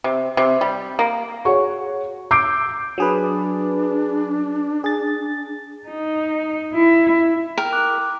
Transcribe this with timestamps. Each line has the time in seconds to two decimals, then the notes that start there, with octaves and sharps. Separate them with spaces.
0.04 C3
0.37 C3
0.61 G3
0.99 A#3
1.45 F#4 G#4 C#5 F#5 C#6
2.31 D6 E6 G6 C7 D7
2.98 F#3 D4 G#4 B4
4.84 G#4 A6
5.88 D#4
6.73 E4
7.58 A#4 G5
7.73 D6 F#6